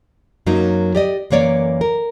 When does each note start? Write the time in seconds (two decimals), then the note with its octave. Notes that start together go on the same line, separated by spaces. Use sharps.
0.46 F#2 F#3 A#3 D#4
0.95 G4 D5 D#5
1.30 F#2 E3 A#3 C#5 D5
1.81 A#4